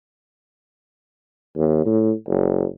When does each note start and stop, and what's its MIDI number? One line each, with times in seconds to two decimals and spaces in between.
1.57 1.82 39
1.86 2.12 45
2.28 2.65 30